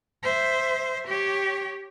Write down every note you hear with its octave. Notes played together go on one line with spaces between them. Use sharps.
C5 E5
G4 C#5